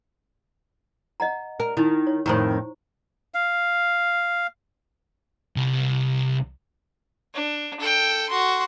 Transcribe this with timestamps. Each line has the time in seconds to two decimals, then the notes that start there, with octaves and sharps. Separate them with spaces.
1.20 D#5 F#5 A#5
1.60 A#4
1.77 D#3 D#4 E4
2.07 C#5
2.26 F2 A2 D#3 C5 A#5 C#6
3.34 F5
5.56 C2 C3
7.34 D4
7.80 A4 G5
8.29 F#4 C6